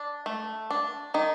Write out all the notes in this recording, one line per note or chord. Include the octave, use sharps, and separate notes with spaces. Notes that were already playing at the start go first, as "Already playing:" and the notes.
Already playing: D4
A3
D4
D#3 D#4